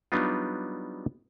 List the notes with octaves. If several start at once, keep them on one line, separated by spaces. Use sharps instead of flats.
F#3 G3 B3 D4 D#4 F4